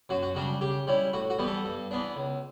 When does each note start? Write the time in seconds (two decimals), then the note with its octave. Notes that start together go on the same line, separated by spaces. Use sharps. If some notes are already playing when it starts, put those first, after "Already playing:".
0.09 F#2 F#4
0.23 F#4
0.35 C#3 G3 D4 F#4
0.61 C#3 G4
0.87 G3 C#4 E4
1.13 A2 F#4
1.30 F#4
1.39 E3 G3 B3
1.47 A4
1.65 G2
1.91 E3 B3 D4
2.16 C#2